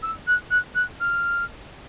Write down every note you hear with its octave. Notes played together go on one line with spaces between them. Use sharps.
E6
F#6
F#6
F#6
F6